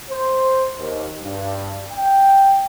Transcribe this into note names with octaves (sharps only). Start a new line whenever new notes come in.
C5
D#2
G2
G5